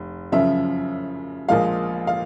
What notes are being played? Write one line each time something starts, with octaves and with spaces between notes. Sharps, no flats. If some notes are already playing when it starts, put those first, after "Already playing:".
Already playing: F1
F#2 C#3 F3 E5
A#1 A#2 F3 G#3 F5
F5